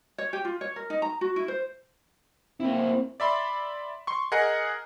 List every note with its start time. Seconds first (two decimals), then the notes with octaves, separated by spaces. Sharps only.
0.18 C#5
0.33 G4
0.45 F4
0.61 C#5
0.76 A#4
0.90 D#4
1.02 A#5
1.21 F#4
1.36 E4
1.48 C5
2.60 A#3 C4 E4
3.20 D5 E5 B5 C6
4.07 C6 C#6
4.32 G#4 A#4 D#5 F#5